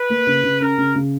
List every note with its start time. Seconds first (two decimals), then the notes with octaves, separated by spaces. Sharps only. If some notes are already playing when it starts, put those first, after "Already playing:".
Already playing: B4
0.10 A#3
0.27 C#3
0.44 C#3
0.61 C#4 A#4
0.78 C#3
0.95 C#3